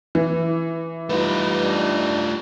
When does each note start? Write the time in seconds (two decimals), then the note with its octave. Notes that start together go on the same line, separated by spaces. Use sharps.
0.15 E3
1.09 G3 A3 D#4 F4 B4
1.63 D4